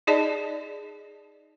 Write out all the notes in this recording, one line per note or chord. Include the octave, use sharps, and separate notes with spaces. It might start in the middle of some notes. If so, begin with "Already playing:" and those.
D#4 G#4 D5 D#5 A5